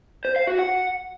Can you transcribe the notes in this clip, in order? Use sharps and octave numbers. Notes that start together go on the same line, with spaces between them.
C5
F5
F#4
F#5